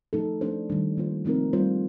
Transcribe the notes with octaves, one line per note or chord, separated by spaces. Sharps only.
F3 A3 D#4 A4
F3 A3 D4 A4 C5
D#3 G3 D4
D#3 A#3 F4 C5
F3 A3 C4 D#4 A#4
G3 C4 F4 C5